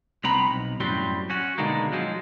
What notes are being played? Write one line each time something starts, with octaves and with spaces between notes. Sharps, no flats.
C2 B3 C4 A#5 B5
B1
F#2 A2 F#3 G3 C4 C6
C#4 F#4
B2 D3 D#3 G#3 A#3
F3 F#3 G#3